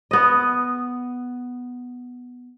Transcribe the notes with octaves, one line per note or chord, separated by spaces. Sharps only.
B3 D#5